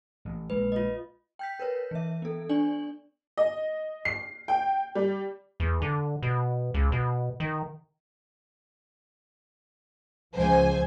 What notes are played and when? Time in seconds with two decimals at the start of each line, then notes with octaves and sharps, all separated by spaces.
0.25 A1
0.50 A#1 G#3 B4
0.72 F4 D#5
1.39 G5 G6 B6
1.59 A#4 B4 C#5
1.91 E3 E5
2.22 B3 A4
2.49 D4 D5 G#5 F#7
3.38 D#5
4.05 C7
4.48 G5
4.95 G3
5.60 E2
5.82 D3
6.23 B2
6.74 C#2
6.92 B2
7.40 D#3
10.36 C#2 F3 C5 G#5